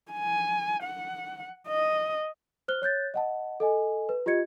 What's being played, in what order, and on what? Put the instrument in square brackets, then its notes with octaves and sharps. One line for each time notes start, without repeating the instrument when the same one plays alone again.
[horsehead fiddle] G#5
F#5
D#5
[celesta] C5 F6 F#6 G7
C#5 F#6 G6 A6
D#5 F#5 A5
A4 D#5 G#5
B4
F4 G4 D#5 G#6 C#7